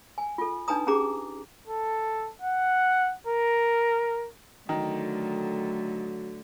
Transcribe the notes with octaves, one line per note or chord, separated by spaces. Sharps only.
G#5
F4 A4
D4 D#4 B4 G#5 A#5 D#6
C#4 G4 G#4 A#5 D6
A4
F#5
A#4
D3 D#3 F#3 A3